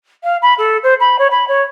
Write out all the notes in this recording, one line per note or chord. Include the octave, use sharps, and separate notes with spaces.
F5
B5
A4
C5
B5
C#5
B5
C#5